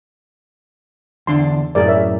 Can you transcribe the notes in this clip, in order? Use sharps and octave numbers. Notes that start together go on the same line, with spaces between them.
E2 D3 D4 C6
F#2 A2 G#4 A#4 D5
A#4 C#5 E5